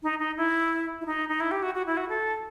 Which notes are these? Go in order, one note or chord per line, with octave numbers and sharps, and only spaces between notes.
D#4
D#4
E4
E4
D#4
D#4
E4
G4
F#4
F#4
E4
F#4
A4